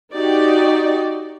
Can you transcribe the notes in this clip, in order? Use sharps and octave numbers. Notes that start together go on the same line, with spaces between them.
D#4 F#4 G4 D5